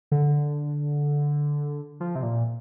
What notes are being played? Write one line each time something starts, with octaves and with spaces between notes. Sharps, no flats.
D3
F3
C3
A#2